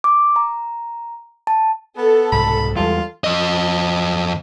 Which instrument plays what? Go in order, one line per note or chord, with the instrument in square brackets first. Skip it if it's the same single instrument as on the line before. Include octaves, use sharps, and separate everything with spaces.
[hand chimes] D6
A#5
A5
[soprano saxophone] B3 [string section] A4
[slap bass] C2 G#2 B2 [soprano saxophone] B5
[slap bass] E2 G3 G#3 [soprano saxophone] F4
[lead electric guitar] F2 D#5